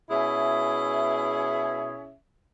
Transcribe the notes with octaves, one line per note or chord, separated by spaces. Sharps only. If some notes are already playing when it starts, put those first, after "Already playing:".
B2 C#4 E4 G#4 E5